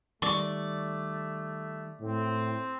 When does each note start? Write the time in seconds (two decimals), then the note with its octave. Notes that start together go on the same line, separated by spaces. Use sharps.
0.22 D#3 G3 A3 D5 C#6
2.01 A2 C4